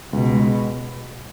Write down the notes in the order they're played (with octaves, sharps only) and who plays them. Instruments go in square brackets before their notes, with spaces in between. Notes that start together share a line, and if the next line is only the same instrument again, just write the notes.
[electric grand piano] C#2 [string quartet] B2
[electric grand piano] G#3